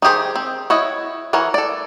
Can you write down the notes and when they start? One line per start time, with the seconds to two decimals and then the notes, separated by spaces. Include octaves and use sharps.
0.02 D#3 D#4 G4 G#4 C5
0.36 C4
0.70 E4 F#4 C#5 D#5
1.33 E3 A#4 C#5 F#5
1.54 A4 D5